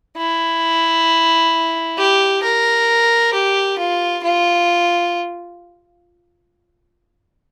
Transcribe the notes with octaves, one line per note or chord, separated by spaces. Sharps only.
E4
G4
A#4
G4
F4
F4